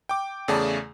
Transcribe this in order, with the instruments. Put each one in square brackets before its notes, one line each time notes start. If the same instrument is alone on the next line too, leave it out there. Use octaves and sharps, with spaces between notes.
[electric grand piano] G5 D6
E2 C#3 A3 G#4 D5 A5